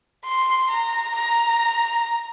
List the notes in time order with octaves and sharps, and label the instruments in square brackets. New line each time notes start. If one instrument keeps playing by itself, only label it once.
[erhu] C6
A#5
A#5